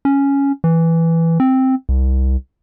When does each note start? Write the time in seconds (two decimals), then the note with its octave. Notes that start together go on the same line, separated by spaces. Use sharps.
0.05 C#4
0.64 E3
1.40 C4
1.89 C2